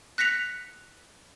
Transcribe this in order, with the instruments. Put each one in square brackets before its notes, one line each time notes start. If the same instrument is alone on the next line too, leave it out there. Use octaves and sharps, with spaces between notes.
[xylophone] F#6 A#6 B6 C#7 F7